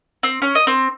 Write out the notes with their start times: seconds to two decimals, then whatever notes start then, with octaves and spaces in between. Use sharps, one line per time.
0.23 C4
0.42 C#4
0.55 D#5
0.67 C4